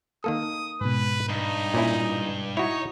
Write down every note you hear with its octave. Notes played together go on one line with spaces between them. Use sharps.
D#3 A#3 A4 D#6
G#2 B2 B4
G2 D#4
A#2 C#4 E4
D#4 E4 F#4 C#5